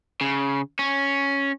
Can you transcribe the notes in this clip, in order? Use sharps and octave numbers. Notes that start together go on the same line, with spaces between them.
C#3
C#4